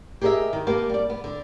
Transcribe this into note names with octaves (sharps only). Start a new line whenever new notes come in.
G4 G#4 A#4 C#5 D#5 E5
D#3
A#3 B3 G4 A5
G3 D5
B3
D3